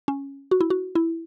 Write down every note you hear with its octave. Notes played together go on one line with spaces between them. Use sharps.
C#4
F#4
E4
F#4
E4